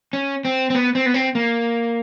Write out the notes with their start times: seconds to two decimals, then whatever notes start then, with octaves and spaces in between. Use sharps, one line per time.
0.13 C#4
0.45 C4
0.70 C4
0.75 B3
0.95 C4
1.06 B3
1.14 C4
1.35 A#3